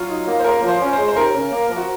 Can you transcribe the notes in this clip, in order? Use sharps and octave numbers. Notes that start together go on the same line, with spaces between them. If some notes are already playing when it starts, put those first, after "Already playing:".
Already playing: F#3 F4
D#4
A#3
C5
C#3 A#4
F3
C5
C#4
C5
G#3
C5
D#2 A#4
C#3
A#3
F3
F#4